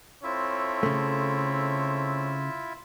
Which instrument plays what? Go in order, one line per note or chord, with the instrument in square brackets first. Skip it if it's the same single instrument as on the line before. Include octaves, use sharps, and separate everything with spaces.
[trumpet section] C4 A4 C#5 [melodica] E4 F4 E5
[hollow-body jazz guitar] C#3 A3